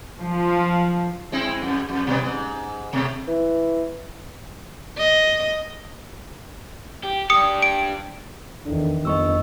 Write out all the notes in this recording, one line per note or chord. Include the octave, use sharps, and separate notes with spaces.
F3
G#3 C4 E4
F2
F2
B2 G3 B3
G#2
B2 A3
E3
D#5
G4
D4 G4 D#6 C#7
D7
E2 D3 D#3
G1 F2 D#5 C#6 E6